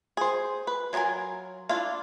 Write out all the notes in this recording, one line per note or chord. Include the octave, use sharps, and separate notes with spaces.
G#4 C5
B4
F#3 B3 F4 A#4 G#5
D4 E4 F4 F5